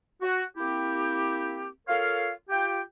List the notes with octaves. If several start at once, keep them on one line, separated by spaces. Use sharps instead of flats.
F#4
A#3 C4 E4 G4
F4 A4 A#4 C#5 F5
F4 G4 G5